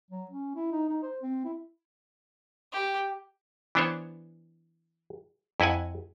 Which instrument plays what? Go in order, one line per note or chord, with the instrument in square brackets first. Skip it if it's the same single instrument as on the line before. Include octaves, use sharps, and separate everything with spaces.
[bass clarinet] F#3
C#4
E4
D#4
D#4
C5
C4
E4
[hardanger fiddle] G4
[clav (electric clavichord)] E3 B3 D4 C5 C#5
F2 E4 D#5 F#5 G#5